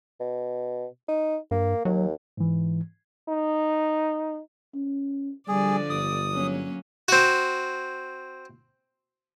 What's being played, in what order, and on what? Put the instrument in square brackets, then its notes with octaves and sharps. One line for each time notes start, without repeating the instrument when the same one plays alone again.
[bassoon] B2
D#4
[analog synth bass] G2 [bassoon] A#3
[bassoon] D#2 [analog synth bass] F#3
[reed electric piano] G#2 E3
[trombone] D#4
[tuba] C#4
[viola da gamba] D3 F3 D5 [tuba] G3 [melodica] G#4
[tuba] G1 [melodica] D#6
[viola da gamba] F#3 A#3 C#4
[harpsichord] C4 F#4